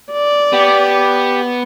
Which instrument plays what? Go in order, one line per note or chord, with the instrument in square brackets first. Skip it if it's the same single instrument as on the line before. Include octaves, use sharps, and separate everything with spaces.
[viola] D5
[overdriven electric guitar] B3 [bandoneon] G4